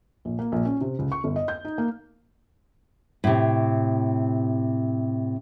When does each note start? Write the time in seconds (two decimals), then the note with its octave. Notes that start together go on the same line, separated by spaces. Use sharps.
0.25 A#1
0.39 A#3
0.52 A#1
0.65 C#4
0.81 C3
0.99 C#2
1.12 C#6
1.24 G1
1.36 D#5
1.48 G6
1.65 D#4
1.78 A#3
3.24 A2 C3